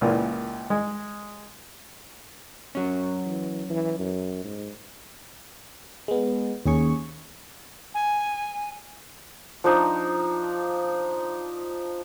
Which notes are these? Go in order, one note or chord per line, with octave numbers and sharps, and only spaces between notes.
C#2 A#2 E3 A#3
G#3
F#2 F#3 C#4
E3
E3
F#2
G#2
G#3 B3
D#2 C#4 G#4 C#6
G#5
F3 D4 D#4 A#5